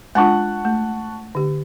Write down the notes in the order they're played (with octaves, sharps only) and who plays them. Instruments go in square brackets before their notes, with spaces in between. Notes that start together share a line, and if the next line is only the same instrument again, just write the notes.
[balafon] G#3 D4 F4 [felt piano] F#5 A5 C#6
[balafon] A3
D3 G4